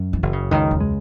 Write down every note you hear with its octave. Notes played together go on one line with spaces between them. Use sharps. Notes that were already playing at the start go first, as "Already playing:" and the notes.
Already playing: F#2
E3
F#1
C#3
C#2 D#3
E2
G#3